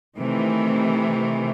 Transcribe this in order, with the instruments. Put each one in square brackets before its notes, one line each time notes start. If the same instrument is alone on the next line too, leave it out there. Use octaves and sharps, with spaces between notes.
[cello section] C3 D#3 E3 A3